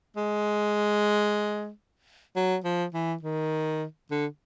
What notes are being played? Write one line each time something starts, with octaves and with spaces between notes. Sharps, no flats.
G#3
F#3
F3
E3
D#3
D3